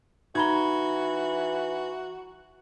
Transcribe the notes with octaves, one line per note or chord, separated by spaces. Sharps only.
E3 D#4 F#4 A#5 B5 G#6 G7